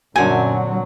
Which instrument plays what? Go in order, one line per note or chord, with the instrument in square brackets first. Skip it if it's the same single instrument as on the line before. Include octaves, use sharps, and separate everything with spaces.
[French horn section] F#2 [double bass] A#2 F#3 [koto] D3 C4 [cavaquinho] G#5